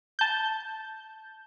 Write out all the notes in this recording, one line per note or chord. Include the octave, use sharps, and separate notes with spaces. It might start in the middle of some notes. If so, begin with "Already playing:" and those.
A5 G6